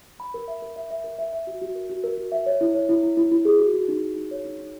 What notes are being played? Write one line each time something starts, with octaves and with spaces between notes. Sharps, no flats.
B5
A#4
E5
A#4
E5
E5
A#4
E5
E5
F#4
F#4
A#4
F#4
A#4
F#4
E5
C#5
E4
C#5
E4
E4
E4
E4
G#4
F#4
F#4
D#4
F#4
D#4
C#5
D#4
D#4